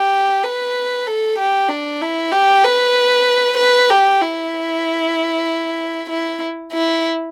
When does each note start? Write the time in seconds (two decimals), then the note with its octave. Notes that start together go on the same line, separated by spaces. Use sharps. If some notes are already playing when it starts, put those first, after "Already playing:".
Already playing: G4
0.44 B4
1.06 A4
1.38 G4
1.69 D4
2.01 E4
2.32 G4
2.64 B4
3.58 B4
3.90 G4
4.22 E4
6.10 E4
6.73 E4